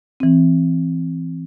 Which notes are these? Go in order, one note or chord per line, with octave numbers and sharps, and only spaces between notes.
E3 C4